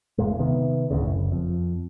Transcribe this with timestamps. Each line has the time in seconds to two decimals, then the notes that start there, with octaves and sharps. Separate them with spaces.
0.18 G1 E2 A#2 G#3
0.39 C3 D#3 B3
0.91 D1 D2 A2 C#3
1.04 F#1
1.32 F2